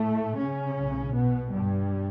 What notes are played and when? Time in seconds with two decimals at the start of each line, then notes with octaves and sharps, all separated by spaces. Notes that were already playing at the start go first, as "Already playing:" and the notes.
Already playing: A2 A3
0.37 C#3 C#4
0.75 B1 A2
1.13 B2 B3
1.50 G2 G3